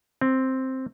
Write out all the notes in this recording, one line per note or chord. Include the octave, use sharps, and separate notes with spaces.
C4